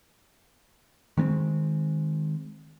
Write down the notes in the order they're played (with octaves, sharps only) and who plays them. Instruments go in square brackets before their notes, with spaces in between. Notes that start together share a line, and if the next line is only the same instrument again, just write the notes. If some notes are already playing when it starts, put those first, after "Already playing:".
[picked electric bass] D#3 G#3 B3 C4